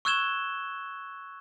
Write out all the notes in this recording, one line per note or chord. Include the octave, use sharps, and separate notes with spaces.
C#6 E6 F#6 G#6 E7 G7